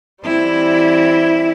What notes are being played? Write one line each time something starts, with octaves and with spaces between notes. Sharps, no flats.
E3 G3 C4 E4